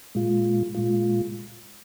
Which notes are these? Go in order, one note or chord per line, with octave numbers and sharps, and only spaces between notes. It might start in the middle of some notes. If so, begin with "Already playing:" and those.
A#2 G#3 F4
A#2 G#3 F4